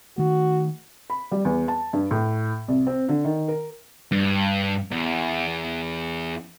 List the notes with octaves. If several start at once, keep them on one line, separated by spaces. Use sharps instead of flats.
D#3 A3 F#4
B5
G3
E2
A5
G2
A2
C2
C4
D3
D#3
A#4
G2
E2